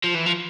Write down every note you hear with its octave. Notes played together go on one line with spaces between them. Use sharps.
F3
E3
F3